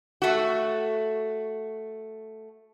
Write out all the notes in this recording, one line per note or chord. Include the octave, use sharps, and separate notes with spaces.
A3 F#4